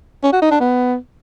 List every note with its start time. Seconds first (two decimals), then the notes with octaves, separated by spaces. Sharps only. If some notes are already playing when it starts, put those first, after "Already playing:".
0.24 C#4
0.33 F#4
0.42 D#4
0.51 D4
0.60 B3